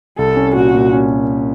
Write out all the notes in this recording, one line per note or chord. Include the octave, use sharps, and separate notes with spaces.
C2 A4
C#4
A#2 F#4
A#2
C#4